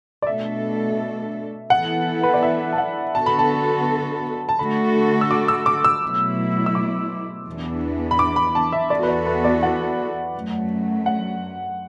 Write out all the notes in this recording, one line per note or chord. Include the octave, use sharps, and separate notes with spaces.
D5
B2 A3 D4 A4 E5
E3 B3 E4 A4 F#5
B4
D5
E5
A5
F#5
D3 B3 F#4 A4 A5
B5
A5
A5
D3 A3 F#4 A4 B5
E6
D6
E6
D6
E6
B2 F#3 A3 E4
E6
D6
E2 E3 B3 D4
B5
D6
B5
A5
E5
E2 E3 B3 F#4 A4 D5
B4
D5
B4
D5
F#5
F#2 F#3 A3
F#5